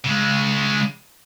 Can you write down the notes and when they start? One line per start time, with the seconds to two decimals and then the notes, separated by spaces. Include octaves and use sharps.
0.04 C#3 G#3